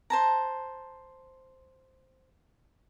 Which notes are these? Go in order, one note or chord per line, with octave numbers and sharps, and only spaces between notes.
C5 A5 A#5